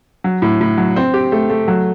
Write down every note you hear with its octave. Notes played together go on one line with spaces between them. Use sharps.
F#3
A2
A2
F#3
C4
G4
A3
A3
F#3